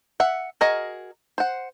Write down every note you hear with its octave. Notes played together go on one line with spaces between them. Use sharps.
E5 F#5
F#4 G#4 A#4 D#5
C5 F#5